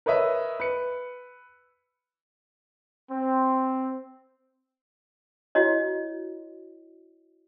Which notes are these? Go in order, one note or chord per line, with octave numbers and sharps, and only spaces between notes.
A#4 B4 C#5 D#5 E5
B4 C#7
C4
E4 F#4 C#5 D#5